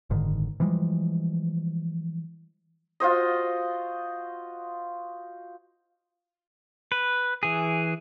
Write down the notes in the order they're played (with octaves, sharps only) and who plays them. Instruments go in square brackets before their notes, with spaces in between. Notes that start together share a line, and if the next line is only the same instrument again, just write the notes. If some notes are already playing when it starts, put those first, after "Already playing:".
[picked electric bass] F#1 G#2 D3 D#3
E3 F3 G3 G#3
[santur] F4 F#4 C5 D#5
[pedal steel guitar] B4
E3 G#4